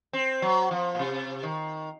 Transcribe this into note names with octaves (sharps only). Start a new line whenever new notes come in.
C4
F#3
F3
A#2
C3
D#3